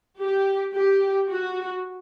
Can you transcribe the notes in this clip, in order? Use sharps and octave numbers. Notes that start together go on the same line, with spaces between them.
G4
G4
F#4